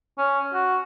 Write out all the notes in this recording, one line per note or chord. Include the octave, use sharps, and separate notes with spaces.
C#4
F#4